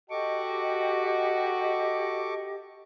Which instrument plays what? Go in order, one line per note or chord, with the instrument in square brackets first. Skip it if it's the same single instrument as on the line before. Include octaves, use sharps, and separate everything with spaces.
[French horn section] F#4 [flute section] G4 D#5 [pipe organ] A4 C#6 D6